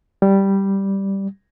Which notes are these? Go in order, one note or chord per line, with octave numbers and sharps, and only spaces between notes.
G3